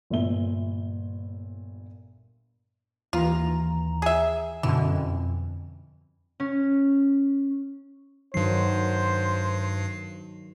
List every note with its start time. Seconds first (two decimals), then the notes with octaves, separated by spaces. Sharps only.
0.10 G1 A#2 E5 G7
3.13 D#2 E3 F4 A#5
4.02 G#4 E5
4.63 F#2 B2 D3 E3
4.92 F2
6.40 C#4
8.34 G2 D#3 F#3 C5 C7